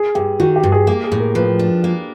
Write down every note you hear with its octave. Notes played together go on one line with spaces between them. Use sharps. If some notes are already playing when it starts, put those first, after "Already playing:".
Already playing: G#4
G2 G4
D#3 F#4
G4
G2
G#4
A#3 G4
G#4
A2
A#4
F3 B4
D4
A#3